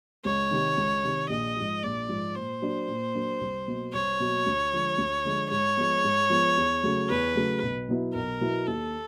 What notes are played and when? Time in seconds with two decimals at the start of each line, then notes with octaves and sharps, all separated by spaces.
0.25 C#2 C#5
0.51 C3 D#3
0.77 C#2
1.04 C3 D#3
1.29 A#1 D#5
1.56 G#2 F3
1.83 A#1 D5
2.09 G#2 F3
2.36 A#2 C5
2.62 F#3 A#3 D4
2.88 A#2
3.15 F#3 A#3 D4
3.41 C2
3.68 B2 F#3 A#3
3.94 C2 C#5
4.20 B2 F#3 A#3
4.46 D2
4.73 D3 F3 G#3
4.98 D2
5.25 D3 F3 G#3
5.51 G#2 C#5
5.77 F3 G#3 B3
6.04 G#2
6.30 F3 G#3 B3
6.57 E2
6.83 C#3 F#3 A3
7.09 E2 B4
7.35 C#3 F#3 A3
7.62 B1
7.89 B2 F#3 B3 E4
8.15 B1 A#4
8.41 B2 F#3 B3 E4
8.67 D#2 A4